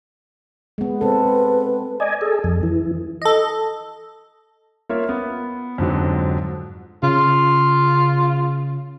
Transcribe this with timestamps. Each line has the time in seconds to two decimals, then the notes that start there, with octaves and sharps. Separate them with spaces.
0.78 G#3 B3
1.01 C4 A4 B4
2.00 D5 D#5 G#5
2.21 G#4 A4
2.44 F2
2.63 E3
3.22 A4 D#5
4.89 A#3 F4 A#4 C#5 E5
5.09 B3
5.78 F2 G#2 D3 F#3
7.03 C#3 F4